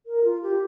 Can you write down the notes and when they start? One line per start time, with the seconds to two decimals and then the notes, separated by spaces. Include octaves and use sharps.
0.06 A#4
0.24 F4
0.42 G4